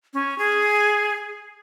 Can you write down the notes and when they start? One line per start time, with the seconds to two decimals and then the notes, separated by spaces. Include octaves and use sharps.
0.13 C#4
0.38 G#4